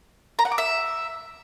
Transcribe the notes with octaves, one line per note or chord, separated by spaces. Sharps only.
A#5
F#5
D6
E5